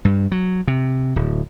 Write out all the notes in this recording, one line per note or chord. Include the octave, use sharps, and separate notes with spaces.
G2
F#3
C3
D1